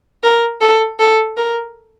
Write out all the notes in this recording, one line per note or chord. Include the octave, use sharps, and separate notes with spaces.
A#4
A4
A4
A#4